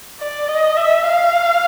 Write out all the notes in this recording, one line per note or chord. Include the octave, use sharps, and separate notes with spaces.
D5
D#5
E5
F5